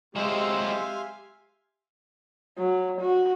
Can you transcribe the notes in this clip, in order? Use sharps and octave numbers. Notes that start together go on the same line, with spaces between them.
F#3 G#3 C4 G4 E5 F5 G#5 C6
F#3
F#4